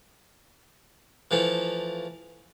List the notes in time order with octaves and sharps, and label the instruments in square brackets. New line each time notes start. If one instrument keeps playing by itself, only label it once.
[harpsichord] E3 F3 A3